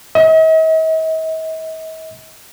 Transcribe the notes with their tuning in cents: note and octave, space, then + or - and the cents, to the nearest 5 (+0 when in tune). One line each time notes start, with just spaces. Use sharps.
D#5 +45